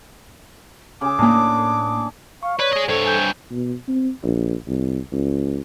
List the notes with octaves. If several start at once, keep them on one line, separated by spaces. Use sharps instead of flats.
C#3 G#4 D6
A2 A#3 D4 G#4
F5 C#6
B4 C#5 D5 G#6
G#4 D#5
G2 A4 C5 C#5
G#5 G6 G#6
B2
C4
A#1
C2
C#2